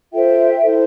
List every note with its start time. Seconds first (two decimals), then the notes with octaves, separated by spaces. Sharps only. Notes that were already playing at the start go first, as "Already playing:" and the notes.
0.12 F4 A4 C5 E5 G5
0.62 E4 A4 C5